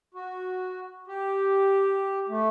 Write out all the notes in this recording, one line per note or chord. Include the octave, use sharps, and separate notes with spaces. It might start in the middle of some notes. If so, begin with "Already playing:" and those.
F#4
G4
A3